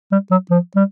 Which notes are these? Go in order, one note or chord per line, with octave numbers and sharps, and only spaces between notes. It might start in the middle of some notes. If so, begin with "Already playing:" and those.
G3
F#3
F3
G3